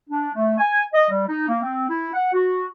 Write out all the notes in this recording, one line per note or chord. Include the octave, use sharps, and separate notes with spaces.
D4
A3
G#5
D#5
G3
D#4
A#3
C4
E4
F#5
F#4